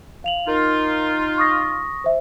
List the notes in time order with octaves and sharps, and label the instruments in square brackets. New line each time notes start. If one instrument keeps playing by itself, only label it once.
[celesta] F5 F7 F#7
[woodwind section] D#4 F4 [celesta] A#4
[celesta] C#6 D#6 A#6
C5 E5